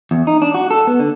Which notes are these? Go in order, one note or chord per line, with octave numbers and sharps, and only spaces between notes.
E2
D#4
D4
F#4
A4
B3
D3